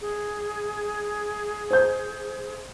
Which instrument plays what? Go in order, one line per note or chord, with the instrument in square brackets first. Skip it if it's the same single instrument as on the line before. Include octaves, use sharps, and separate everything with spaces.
[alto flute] G#4
[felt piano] C5 G6